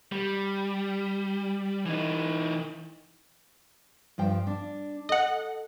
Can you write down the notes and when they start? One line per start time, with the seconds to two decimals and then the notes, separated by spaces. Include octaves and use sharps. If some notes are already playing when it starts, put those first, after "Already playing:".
0.12 G3
1.86 E3 D#4
4.18 G2 F3 G5
4.47 D4
5.09 A4 D#5 F#5